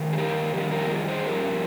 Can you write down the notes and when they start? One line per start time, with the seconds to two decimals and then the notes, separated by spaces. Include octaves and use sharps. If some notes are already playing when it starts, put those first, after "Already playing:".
Already playing: G2 D#3
0.13 G#4
0.18 G4 A#4
0.54 F2 D#3 G3 G4 A#4
0.71 G4 A#4
0.90 F4 G#4
1.08 G#4 C5
1.26 G2 F3 G4 A#4